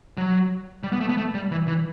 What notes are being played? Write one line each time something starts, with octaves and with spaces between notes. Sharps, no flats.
F#3
G3
B3
A3
B3
A3
G3
E3
E3